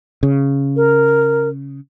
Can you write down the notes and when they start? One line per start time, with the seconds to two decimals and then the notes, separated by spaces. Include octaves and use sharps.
0.23 C#3
0.76 A#4